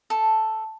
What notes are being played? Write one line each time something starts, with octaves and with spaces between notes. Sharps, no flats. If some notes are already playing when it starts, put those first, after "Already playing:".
A4